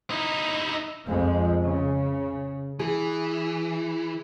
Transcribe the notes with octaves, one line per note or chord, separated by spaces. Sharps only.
D#4 E4
F2 F3 G#3
C#3
E3 G#4